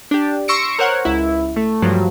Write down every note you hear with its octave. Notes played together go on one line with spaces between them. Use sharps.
D4 G4
C6 C#6 E6 A#6 C#7 D7
A#4 C5 C#5 F#5
C#2 E4
A3
G2 F3 F#3